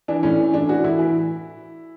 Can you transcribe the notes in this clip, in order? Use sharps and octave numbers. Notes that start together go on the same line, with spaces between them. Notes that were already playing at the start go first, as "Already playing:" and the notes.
E3 D4
A2 C#4
E3
A2 D4
E3 F#4
A2 E4
E3